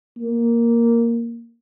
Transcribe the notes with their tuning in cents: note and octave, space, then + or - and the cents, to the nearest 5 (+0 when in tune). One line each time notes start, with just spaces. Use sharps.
A#3 +0